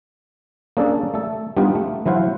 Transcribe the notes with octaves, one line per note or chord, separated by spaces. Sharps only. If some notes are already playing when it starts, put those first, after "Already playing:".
A#3 C#4 D4 G#4 A4 D5
A3 A4
G3 B3 D4 D#4 F4
A3
E3 F#3 E4 C5 F5 F#5